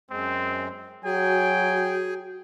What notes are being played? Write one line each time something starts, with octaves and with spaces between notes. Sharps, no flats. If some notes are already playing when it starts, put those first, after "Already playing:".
F#2 G#3 C4
F#3 F#4 G#4 G5 G#5